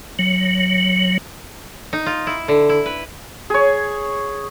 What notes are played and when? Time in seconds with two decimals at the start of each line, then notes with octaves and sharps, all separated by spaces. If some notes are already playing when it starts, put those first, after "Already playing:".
0.19 F#3
1.93 D#4
2.06 F4
2.27 E4
2.48 D3
2.69 E4
2.86 B4
3.50 G#4 C#5